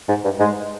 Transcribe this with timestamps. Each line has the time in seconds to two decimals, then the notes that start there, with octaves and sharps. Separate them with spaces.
0.09 G#2
0.24 G2
0.40 G#2 G#3